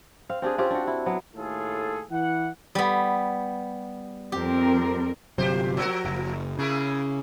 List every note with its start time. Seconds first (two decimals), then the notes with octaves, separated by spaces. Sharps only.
0.29 C4 F5
0.42 C4 D4 G4 G#4
0.58 C4 C#4 F4 G4
0.70 D4 F#4
0.87 E4
1.06 F#3 B3
1.35 D#2 A2 A3 F4 G#4 A4
2.11 E3 F#5
2.75 G3 B3
4.32 F2 C4 G4 A#4
5.38 G1 C3 F#3 F4 G4 C5
5.77 F3 F#4 A#4
6.05 F#1
6.59 C#3 A#3 E4 G#4